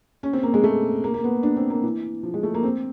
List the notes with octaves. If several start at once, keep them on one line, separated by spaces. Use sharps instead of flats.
C#4
C4
A#3
G#3
A3
A#3
A#3
B3
D4
C4
A#3
E3
F3
G#3
A3
A#3
C4